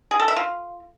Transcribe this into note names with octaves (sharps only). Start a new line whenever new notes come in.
G#4
A4
E5
F4